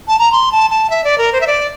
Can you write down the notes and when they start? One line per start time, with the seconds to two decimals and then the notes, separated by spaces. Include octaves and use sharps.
0.08 A5
0.19 A#5
0.32 C6
0.52 A5
0.70 A5
0.90 E5
1.04 D5
1.18 A#4
1.33 C5
1.41 E5
1.47 D5